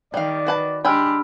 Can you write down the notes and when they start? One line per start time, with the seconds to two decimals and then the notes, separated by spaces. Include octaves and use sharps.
0.14 D#3 G3 D5 F5
0.47 F#4 B4 A5
0.85 G#3 D4 G4 G#4 G5 B5 E6 F6